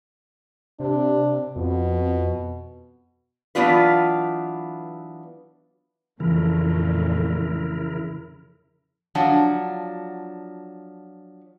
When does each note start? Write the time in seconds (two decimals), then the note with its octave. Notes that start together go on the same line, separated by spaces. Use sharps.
0.80 C3 D4
1.56 F2 B2
3.55 E3 F#3 B3 D4 F4 B4
6.20 F2 A#2 C#3 E3 F3 A3 E4 A#4
9.15 F3 F#3 D4 F#4